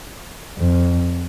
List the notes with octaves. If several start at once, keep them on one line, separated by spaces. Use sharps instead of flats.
F2